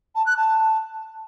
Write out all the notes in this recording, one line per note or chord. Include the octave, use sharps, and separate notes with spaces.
A5
F#6
A5